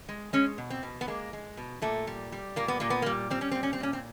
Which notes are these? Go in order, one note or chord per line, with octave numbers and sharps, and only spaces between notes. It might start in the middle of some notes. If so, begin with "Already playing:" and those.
G#3
G#3 C#4
B2
C4
B2
B3
G#3 A#3
G#3
B2
A#2 A3
G3
G3
A#2 A#3
B3
A#2 A#3
B3
A#3
G3
G3 C4
C#4
A#2 C4
C#4
C4
A#2 C#4
C4